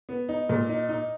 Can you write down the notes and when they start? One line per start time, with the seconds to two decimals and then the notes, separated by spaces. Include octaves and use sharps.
0.09 B3
0.29 D#4
0.49 A#2
0.69 D#4
0.89 D#4